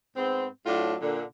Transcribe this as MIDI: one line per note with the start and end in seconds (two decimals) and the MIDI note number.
0.16 0.46 44
0.16 0.46 59
0.16 0.46 60
0.66 0.95 45
0.66 0.95 54
0.66 0.95 62
0.66 0.95 65
1.01 1.22 46
1.01 1.22 50